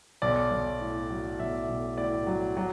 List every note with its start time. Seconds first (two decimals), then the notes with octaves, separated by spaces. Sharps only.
0.22 B1 D5
0.51 B1
0.81 A2
1.10 F#3
1.39 B1 E5
1.68 B1
1.98 A2 D5
2.27 F#3
2.57 F#3